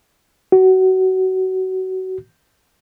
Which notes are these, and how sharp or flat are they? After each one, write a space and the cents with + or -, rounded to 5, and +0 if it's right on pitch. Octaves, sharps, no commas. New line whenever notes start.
F#4 +25